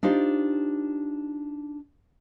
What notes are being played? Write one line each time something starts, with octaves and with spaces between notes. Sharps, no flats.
D4 D#4 F4 G4 C5